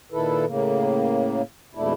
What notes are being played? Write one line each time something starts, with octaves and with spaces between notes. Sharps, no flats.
A#2 D#3 E4 A4 B4
A2 C#3 A#3
F2 G#2 B2 A3 D4 E4